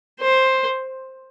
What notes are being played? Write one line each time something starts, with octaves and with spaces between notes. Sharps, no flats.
C5